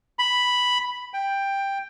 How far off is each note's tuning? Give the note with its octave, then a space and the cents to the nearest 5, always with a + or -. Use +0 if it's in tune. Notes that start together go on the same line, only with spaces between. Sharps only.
B5 +0
G5 +10